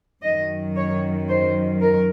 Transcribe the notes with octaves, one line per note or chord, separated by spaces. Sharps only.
F#2 D#3 F#3 D#5
C#5
C5
A#4